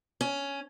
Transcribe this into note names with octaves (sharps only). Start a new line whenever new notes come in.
C#4